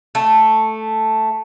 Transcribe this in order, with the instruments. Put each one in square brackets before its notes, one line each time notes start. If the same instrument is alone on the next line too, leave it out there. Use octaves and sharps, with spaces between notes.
[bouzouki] A3